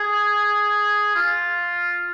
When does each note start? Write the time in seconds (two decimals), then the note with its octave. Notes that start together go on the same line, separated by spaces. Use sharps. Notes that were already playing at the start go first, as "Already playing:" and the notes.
Already playing: G#4
1.15 F4